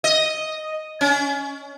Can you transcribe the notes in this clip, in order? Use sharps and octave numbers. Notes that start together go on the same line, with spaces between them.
D#5
C#4